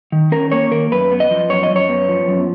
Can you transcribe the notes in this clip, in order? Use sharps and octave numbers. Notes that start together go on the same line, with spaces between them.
D#3
C#4 A#4
A#3 C#5
D#3 A#4
F#2 B4
B3
D#5
F3
F#2 C#5
D#5
F#2
C#5
B3
F3
F#2